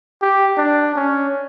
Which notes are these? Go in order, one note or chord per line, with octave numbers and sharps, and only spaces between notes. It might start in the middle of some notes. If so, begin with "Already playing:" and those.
G4
D4
C#4